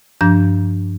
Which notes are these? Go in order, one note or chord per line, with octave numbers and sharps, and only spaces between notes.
G2 F3 D4 G6